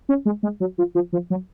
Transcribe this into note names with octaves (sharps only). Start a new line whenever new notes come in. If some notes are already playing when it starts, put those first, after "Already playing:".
C#4
G#3
G#3
F#3
F3
F3
F3
F#3